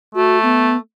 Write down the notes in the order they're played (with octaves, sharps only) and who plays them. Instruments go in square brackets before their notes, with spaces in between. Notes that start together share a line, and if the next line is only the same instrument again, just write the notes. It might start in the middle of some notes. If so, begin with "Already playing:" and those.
[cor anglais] A3 [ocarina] F#4
[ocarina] B3